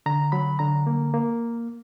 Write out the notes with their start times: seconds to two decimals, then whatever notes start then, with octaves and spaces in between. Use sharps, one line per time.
0.06 D3 A#5
0.32 F#3 B5
0.59 D3 A#5
0.87 A#3
1.14 A#3